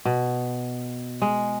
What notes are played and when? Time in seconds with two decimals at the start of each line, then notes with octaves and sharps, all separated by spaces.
0.05 B2
1.22 G#3